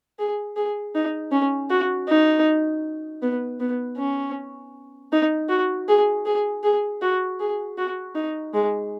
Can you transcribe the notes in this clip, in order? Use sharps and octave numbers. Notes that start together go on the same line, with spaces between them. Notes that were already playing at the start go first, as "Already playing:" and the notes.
G#4
G#4
D#4
C#4
F#4
D#4
B3
B3
C#4
D#4
F#4
G#4
G#4
G#4
F#4
G#4
F#4
D#4
G#3